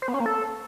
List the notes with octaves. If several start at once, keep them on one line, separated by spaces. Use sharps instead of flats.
C5
B3
C#4
A#3
A4